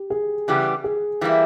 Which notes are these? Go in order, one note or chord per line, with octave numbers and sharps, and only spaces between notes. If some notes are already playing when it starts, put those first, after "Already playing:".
Already playing: G4
G#4
C#3 E3 G3 B3 G4
G#4
E3 G3 A#3 E4